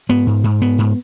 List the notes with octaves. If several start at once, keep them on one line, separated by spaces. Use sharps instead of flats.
G#2 B3
G#2
G#2
G#2 B3
G#2